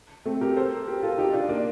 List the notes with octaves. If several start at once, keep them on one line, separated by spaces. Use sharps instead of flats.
A3 C4
G4 A#4
A4 C5
G4 A#4
F4 A4
D#4 G4
D4 F4
A#3 D4